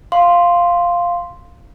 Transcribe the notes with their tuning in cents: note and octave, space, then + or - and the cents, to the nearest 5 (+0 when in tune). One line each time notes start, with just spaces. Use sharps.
F5 +0 C6 +0